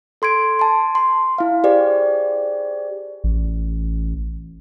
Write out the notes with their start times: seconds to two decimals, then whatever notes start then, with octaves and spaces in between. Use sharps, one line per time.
0.22 A4 C6 G#6 D7
0.59 A5 C6
0.95 C6
1.38 E4 F5
1.64 G4 G#4 C5 D5
3.24 A1